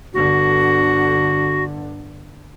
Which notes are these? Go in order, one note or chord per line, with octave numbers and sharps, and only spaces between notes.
G1 D3 F#4